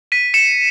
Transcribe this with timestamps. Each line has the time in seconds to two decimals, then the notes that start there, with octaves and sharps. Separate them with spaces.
0.12 B6 D#7
0.34 C#7 E7